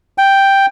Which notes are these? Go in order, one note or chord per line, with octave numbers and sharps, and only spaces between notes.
G5